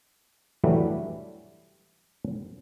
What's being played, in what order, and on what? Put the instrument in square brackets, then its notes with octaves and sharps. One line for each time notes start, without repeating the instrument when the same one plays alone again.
[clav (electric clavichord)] E3 F#3 G3 A3 D4